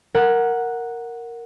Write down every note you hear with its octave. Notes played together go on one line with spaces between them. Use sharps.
A#4 F#5